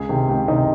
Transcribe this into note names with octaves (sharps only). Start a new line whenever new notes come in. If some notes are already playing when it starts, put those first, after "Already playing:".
Already playing: C#2 G#4
C3 D#3
C#2 G4
C3 D#3 D#4